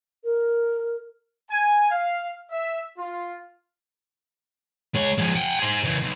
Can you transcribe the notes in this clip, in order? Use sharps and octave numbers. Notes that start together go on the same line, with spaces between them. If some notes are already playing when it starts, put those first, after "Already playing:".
A#4
G#5
F5
E5
F4
G#3 C#5
F3 G#3
F#5 G5
G#4 C5
C#3 E3
B1